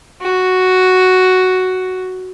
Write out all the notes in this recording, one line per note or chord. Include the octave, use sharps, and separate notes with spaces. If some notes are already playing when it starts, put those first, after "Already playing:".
F#4